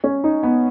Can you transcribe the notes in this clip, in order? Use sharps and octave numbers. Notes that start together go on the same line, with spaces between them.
C#4
D#4
B3